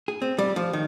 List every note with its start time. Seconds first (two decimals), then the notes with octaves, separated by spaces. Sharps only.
0.08 G#4
0.22 C4
0.38 G3
0.56 F3
0.73 D#3